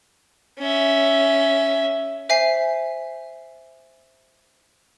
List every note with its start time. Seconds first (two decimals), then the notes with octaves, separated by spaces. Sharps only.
0.59 C#4 E5
2.29 C5 E5 G#5 B6 C7